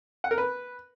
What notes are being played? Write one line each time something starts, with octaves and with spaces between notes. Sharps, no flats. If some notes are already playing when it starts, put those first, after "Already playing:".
F#5
A#4
B4